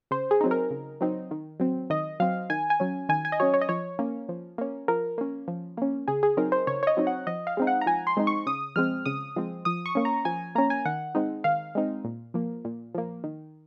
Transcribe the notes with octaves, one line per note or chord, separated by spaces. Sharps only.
C#3 C5
G#4
F#3 C4 D#4
A#4
C#3
F#3 C4 D#4
D#3
F#3 C4
D#3 D#5
F#3 C4 F5
D#3 G#5
G#5
F#3 C#4
D#3 G#5
G#5
D#5
F#3 C#4 C#5
C#5
D#5
F3 C#5
A#3 C#4
F3
A#3 C#4
F3 A#4
A#3 C#4
F3
A#3 C#4
C#3 G#4
G#4
F#3 C4 D#4 A#4
C5
C#3 C#5
C#5
D#5
F#3 C4 D#4
F#5
F3 D#5
F5
G#3 C4 D#4
F#5
A#5
F3 G#5
C6
G#3 C4 D#4
C#6
C#3 D#6
F3 G#3 C4 F6
C#3 D#6
F3 G#3 C4
F3 D#6
C#6
A#3 C#4
A#5
F3 G#5
A#3 C#4 A#5
G#5
D#3 F#5
G#3 C4 D#4
D#3 F5
G#3 C4 D#4
A#2
F3 A#3
A#2
F3 A#3
D#3